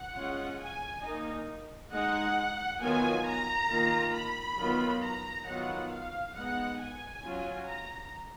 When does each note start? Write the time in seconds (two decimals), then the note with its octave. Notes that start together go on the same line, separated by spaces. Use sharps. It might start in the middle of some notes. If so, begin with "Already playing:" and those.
Already playing: F#5
0.15 G#3 C#4 F4
0.60 G#5
1.03 D#3 A#3 D#4
1.92 G#3 D#4 F#5
2.81 D#3 F#3 B3 F4 G#5
3.25 A#5
3.70 D#3 A#3 F4
4.14 B5
4.58 D#3 F#3 B3 F4
5.02 A#5
5.46 D#3 F#3 B3 F4 F#5
5.91 F5
6.35 G#3 B3 D#4 F#5
6.79 G#5
7.24 F#3 C#4 F4
7.67 A#5